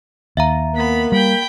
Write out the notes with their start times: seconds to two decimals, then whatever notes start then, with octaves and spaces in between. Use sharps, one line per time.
0.37 D#2 E5 F5 A#5
0.75 A#3 B3 B5
1.12 G3 G5 B5